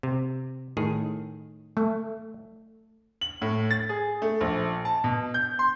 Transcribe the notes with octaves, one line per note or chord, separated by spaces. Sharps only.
C3
A2 D#3 G#4
A3
F#7
A2
A6
G#4
A3
A#1
A5
B2
G6
C6